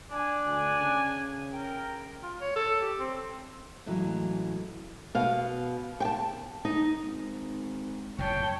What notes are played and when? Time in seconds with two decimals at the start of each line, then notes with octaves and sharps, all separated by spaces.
0.11 D4 G#5
0.45 D2 G#5
0.80 C#3
1.53 A#4 G5
2.23 F4
2.41 C#5
2.55 A4
2.81 G4
2.99 C4
3.86 A2 C#3 E3 F#3 G#3
5.15 B2 F5
6.00 G5 A5
6.65 D#4
7.06 G#1
8.18 F#1 F2 A2 C#5 G5 A5